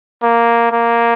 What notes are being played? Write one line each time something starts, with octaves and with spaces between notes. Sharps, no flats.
A#3
A#3